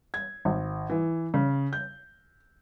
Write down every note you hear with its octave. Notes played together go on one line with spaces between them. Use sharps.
G#6
G#1
E3
C#3
G6